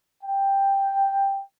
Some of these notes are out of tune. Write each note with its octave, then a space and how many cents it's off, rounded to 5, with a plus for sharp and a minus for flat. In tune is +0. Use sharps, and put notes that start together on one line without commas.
G5 +5